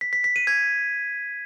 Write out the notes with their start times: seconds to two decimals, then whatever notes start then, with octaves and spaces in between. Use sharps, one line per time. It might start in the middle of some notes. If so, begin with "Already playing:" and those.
0.01 B6
0.13 B6
0.24 B6
0.36 D#7
0.47 G#6